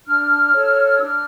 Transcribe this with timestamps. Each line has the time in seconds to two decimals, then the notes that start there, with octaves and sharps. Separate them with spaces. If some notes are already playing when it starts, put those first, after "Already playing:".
0.06 D4 F6
0.53 A4 C#5
0.96 E6
1.01 D4 F6